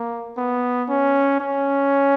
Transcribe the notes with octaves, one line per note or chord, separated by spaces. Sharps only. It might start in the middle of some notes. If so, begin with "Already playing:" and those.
Already playing: A#3
B3
C#4
C#4